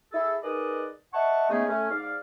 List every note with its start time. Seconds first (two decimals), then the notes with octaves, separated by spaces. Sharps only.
0.12 E4 G#4 A4
0.43 D#4 G#4 A#4 B4 D5 D#5
1.14 D#5 E5 F#5 A5 C#6
1.50 C#3 G#3 A3 B3 D#4 G#4
1.67 A3 C#4
1.91 G#2 D5 F5